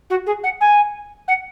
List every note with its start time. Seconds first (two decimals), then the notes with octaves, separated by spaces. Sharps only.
0.10 F#4
0.26 G#4
0.43 F#5
0.60 G#5
1.28 F#5